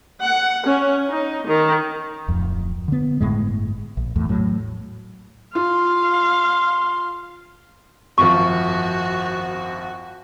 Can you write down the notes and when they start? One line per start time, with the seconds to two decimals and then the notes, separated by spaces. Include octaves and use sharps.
0.23 F#5
0.66 C#4
1.08 D#4
1.47 D#3
2.28 D1 F2
2.88 D3 B3
3.21 G1 C#2 A2 G#3
3.97 A#1
4.16 E2 A2
4.29 A2 F#3
5.55 F4 F5 C6
8.18 G#1 F#2 F3 F#4 C#6